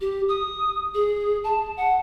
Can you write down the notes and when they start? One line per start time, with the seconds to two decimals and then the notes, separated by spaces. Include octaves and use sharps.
0.01 G4
0.29 D#6
0.94 G#4
1.44 A5
1.77 F#5